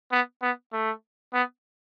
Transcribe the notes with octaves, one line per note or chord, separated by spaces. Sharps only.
B3
B3
A3
B3